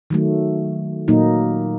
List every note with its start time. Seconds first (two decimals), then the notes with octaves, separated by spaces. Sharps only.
0.10 D#3 F#3 A3
1.08 A#2 F#3 A#3 D#4